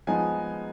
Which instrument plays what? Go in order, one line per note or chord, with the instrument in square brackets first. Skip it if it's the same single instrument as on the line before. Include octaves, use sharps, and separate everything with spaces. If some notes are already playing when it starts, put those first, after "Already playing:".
[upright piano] F3 G#3 B3 D#4 G#5